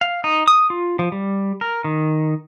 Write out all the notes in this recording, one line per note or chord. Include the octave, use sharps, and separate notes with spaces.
F5
D#4
D#6
F4
F3
G3
A#4
D#3